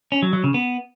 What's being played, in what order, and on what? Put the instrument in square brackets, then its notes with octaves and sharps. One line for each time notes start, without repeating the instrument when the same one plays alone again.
[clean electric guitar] C#4
F#3
F#3
C#3
B3